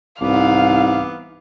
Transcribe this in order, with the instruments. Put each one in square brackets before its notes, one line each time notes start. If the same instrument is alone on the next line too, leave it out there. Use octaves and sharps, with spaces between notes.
[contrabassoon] C2 [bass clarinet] G#2 [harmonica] E3 B3 D6 [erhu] F5